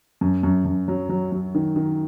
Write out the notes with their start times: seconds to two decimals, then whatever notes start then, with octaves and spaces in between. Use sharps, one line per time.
0.21 F#2
0.43 F#2
0.65 F#2
0.88 F#3
1.09 F#3
1.32 F#3
1.55 D#3
1.76 D#3